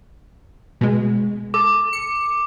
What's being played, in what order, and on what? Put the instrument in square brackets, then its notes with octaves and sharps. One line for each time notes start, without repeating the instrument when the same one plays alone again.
[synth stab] B2 G#3
[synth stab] A4 [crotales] D6
[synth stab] C#7